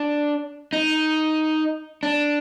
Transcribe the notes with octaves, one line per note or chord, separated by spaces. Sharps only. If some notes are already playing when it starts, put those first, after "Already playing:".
Already playing: D4
D#4
D4